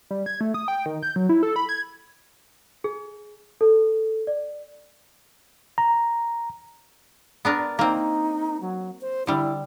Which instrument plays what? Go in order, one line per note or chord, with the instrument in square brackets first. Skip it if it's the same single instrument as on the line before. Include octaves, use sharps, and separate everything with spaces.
[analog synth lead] G3
G#6
A3
D#6
G5
D#3
G6
F#3
E4
A4
B5
G#6
[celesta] G#4
A4
D5
[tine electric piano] A#5
[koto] B3 D4 A#4
[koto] A#3 C4 [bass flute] D#4
[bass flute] F#3
C5
[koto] D3 G3 [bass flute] E4